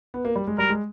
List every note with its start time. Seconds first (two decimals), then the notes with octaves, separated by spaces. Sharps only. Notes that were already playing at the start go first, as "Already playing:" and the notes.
0.14 B3
0.25 A#3
0.36 G3
0.47 G#3
0.58 G3 A#4
0.69 G#3